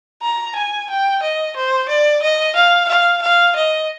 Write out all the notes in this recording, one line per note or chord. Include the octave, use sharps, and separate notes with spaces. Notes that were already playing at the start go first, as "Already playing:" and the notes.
A#5
G#5
G5
D#5
C5
D5
D#5
F5
F5
F5
D#5